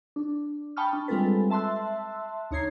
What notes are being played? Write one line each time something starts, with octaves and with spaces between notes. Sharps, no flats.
D4
G5 A5 B5 C#6 D#6 F6
D4
G3 G#3 C4 F4 A4 B4
E5 A5 C6 E6 F#6
D2 D#4 C#5 A#5 G#6 C7